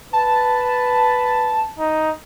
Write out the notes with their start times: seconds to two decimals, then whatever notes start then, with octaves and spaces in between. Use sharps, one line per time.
0.13 B4 A5
1.79 D#4